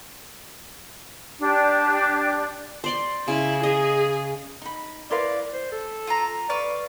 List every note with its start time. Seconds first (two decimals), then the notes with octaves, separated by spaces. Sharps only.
1.39 D4 G4
2.84 C5 D5 C6
3.28 C#3 E4
3.63 G#4 D#5
4.62 D#4 B5
5.10 E4 A#4 B4 D5 F5 C6
5.53 C5
5.72 A4
6.07 F4 A#5
6.49 B4 D5 F5 C#6